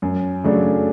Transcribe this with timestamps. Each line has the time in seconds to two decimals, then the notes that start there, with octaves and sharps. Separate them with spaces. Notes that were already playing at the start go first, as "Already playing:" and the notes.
0.02 F#2
0.44 C#3 F#3 A3 D4